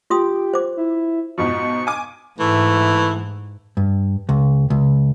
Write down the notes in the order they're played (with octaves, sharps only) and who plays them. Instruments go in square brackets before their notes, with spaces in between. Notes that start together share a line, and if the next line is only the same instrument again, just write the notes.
[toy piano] F4 C6 D#6 [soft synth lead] G4
[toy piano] C5 D6
[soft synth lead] E4
[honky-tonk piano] G#2 B2 F3 [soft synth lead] C#6
[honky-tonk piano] G#5 D6
[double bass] G#2 [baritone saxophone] E3 [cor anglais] A3
[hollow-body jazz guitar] G2
C#2
C#2